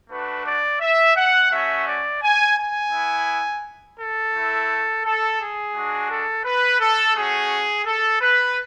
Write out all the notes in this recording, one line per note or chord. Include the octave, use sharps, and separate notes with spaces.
A3 D4 F#4 B4
D5
E5
F#5
A3 C#4 F#4 E5
D5
G#5
G#5
B3 E4
A4
A3 E4
A4
G#4
G#3 D4 F#4
A4
B4
A4
A3 C#4 F#4 G#4
A4
B4